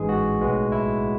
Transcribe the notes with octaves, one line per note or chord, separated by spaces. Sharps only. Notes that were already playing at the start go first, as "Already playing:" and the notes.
Already playing: A1 G#2 E3 G#3 G#4
F#4
B1 A2 G#3 B3
E4